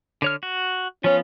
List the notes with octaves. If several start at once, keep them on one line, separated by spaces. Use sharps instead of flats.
D3 C#5 F6
F#4
F3 B3 C#4 F4